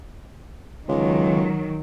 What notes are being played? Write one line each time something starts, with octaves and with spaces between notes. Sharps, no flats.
C#2 D#3 F#3